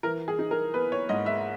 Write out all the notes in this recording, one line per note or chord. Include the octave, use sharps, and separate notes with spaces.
E3 A#4
G#4
D#4
A#4
B3 B4
C#5
G#2 D#5
E5